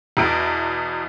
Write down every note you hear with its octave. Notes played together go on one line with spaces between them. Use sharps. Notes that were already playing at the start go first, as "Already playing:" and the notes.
E2 B2 D7